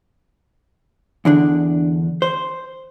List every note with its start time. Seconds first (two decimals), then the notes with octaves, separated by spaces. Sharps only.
1.25 E2 D3 D4
2.22 C5